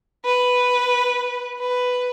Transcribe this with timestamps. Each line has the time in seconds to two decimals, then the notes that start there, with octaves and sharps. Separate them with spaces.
0.25 B4
1.59 B4